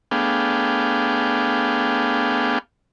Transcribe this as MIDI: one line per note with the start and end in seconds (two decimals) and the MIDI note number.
0.11 2.58 57
0.11 2.58 59
0.11 2.58 62
0.11 2.58 68
0.11 2.58 77
0.11 2.58 79